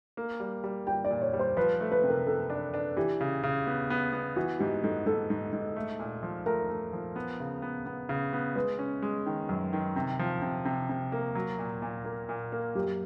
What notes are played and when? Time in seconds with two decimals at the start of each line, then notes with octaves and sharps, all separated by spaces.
0.17 A#3
0.40 G3
0.64 G3
0.87 G3 G5
1.04 D5
1.10 A#2
1.22 C#5
1.33 G3
1.39 C5
1.57 F3 B4
1.80 A3
1.92 B4
2.03 C3
2.09 A#4
2.27 C3 A4
2.50 D4
2.74 D4
2.97 E3 G4
3.21 C#3
3.43 C#3
3.67 B3
3.90 B3
4.13 B3
4.36 E3 F#4
4.59 G#2 G4
4.83 G#2 A4
5.06 G#2 A4
5.30 G#2
5.52 G#2
5.76 A3
5.99 A#2
6.23 F3
6.46 A3 A#4
6.69 A3
6.93 F3
7.16 B3
7.40 C#3
7.62 B3
7.86 B3
8.09 C#3
8.33 B3
8.56 G#3 B4
8.79 C#4
9.02 G#3
9.26 D#3
9.49 F#2
9.73 D#3
9.96 C3
10.19 F3
10.42 C3
10.65 C3
10.89 C3
11.12 A#3
11.35 F#3
11.59 A#2
11.82 A#2
12.05 A#3
12.29 A#2
12.52 A#3
12.75 F#2 G4